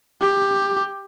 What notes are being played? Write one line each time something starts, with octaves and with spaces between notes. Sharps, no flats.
G4